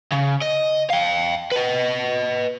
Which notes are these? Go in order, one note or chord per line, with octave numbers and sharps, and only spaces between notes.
C#3
D#5
F5 G5
B4 D#5